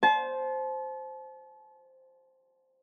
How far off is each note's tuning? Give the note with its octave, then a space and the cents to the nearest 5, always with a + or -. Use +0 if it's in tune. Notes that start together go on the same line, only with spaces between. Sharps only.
C5 +0 A5 -35